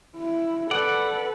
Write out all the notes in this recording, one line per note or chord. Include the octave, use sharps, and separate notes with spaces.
E4
A4 B4 D5 F#5